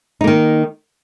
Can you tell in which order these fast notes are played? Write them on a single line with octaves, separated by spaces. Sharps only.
D#4 A#3 D#3